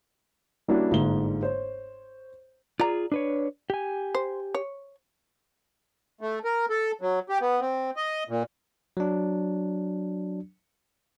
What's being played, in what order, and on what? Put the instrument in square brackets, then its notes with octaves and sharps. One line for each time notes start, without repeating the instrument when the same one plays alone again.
[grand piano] G3 A#3 C#4 D4 E4 F#4
G1 G#2 D3 A#3 G7
C5 C#5
[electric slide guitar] F4 G#4 [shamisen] D5 A#5
[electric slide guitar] D4 B4 C#5
G4 G#5
[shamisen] C5
C#5
[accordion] A3
A#4
A4
F#3
G4
B3
C4
D#5
A#2
[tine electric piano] F#3 D4